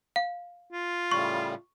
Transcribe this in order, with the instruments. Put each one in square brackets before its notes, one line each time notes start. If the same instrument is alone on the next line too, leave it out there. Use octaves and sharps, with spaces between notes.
[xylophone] F5
[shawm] F4
[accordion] A2 C#3 G3 [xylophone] C#6